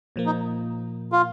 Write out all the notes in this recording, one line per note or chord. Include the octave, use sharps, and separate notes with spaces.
A#2 F3 A#3
D#4
F4